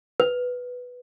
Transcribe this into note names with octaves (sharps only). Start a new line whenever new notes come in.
B4